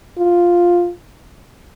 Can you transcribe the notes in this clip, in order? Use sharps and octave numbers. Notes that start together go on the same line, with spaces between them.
F4